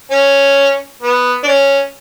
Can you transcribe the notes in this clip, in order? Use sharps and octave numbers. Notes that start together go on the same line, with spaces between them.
C#4
B3
D4
C#4